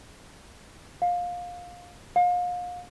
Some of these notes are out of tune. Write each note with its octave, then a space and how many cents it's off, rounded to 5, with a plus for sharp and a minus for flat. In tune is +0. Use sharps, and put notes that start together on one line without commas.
F5 +20
F5 +35